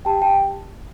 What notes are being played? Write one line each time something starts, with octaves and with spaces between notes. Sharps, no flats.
G4 G5 A5
G4 G5 A5